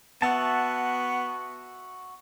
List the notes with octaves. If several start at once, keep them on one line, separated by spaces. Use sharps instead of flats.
B3 F#4 E5 A5